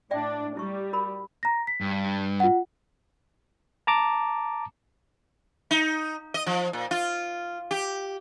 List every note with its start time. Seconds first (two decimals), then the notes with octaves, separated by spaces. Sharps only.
0.11 A2 D4 D5 E5 G5
0.57 G3 E4 C#6
0.93 F#4 A#4 B5
1.43 A#5 A#6
1.67 B6
1.81 G2
2.40 F4 F#5
3.87 A5 A#5 D6
5.71 D#4
6.34 D#5
6.46 F3
6.73 A#2
6.91 F4
7.71 G4